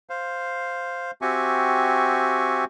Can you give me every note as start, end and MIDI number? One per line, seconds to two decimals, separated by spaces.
0.10 1.11 72
0.10 1.11 77
1.22 2.65 60
1.22 2.65 66
1.22 2.65 67
1.22 2.65 76
1.22 2.65 80
1.22 2.65 85